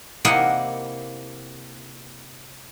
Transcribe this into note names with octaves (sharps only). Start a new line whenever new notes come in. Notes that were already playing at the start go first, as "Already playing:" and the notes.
C3 A#3 E4 D#5 F#5